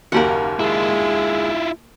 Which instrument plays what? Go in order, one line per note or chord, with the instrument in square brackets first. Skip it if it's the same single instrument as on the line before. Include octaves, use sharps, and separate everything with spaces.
[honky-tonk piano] F#1 D#2 A#5 [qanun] A#3 G4 F#5
[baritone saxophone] G#3 [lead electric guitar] E4 F4